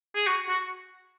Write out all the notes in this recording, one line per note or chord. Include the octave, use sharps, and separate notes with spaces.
G#4
F#4
F#4